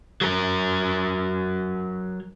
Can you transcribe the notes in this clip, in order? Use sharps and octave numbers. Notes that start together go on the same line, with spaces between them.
F#3 A#4